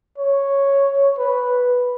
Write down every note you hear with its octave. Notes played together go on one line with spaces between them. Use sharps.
C#5
B4